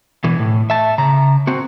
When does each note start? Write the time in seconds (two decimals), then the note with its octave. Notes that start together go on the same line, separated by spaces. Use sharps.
0.24 B2 E3
0.39 A2
0.70 E5 A5
0.98 C#3 A#5
1.47 C4 F#4